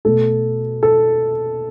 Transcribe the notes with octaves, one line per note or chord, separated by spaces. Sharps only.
B2 A3 A4
A4